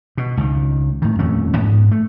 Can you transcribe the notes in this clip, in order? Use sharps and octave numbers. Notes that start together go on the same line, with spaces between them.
B2
C#2 D#3
A2 D#3
D#1 F2 A3 C#4
G#2 B3
A3